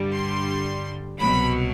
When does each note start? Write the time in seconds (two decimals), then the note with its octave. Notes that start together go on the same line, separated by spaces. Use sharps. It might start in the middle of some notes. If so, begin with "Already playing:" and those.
Already playing: G2 D3 G3
0.12 C6
1.19 C2 B2 F#3 B5